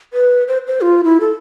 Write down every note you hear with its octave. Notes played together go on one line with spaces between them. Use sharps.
B4
C5
C5
F4
E4
A4